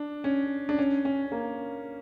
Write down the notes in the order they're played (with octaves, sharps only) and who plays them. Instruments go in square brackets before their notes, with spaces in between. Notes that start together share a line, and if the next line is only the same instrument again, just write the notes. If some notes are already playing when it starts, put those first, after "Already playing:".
Already playing: [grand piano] D4
C#4
D4
C#4
C#4
A#3